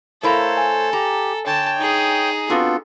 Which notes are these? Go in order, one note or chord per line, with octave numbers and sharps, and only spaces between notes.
A3 E4 A4 A#4 C5 C#5 F5 A#5
G#5
G4 A#5
D3 C#5 G5 A5
D#4 G#4
B3 C4 D4 F4 F#4 A4